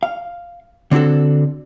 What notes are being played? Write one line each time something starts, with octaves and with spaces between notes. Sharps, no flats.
F5
D3 C4 D4 F#4 A4